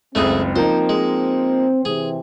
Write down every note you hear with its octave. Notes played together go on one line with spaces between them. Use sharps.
F#1 C#2 A3 C4 D#4 G#4
F3 A#3 D#4 C5
G#3
C3 E3 G#4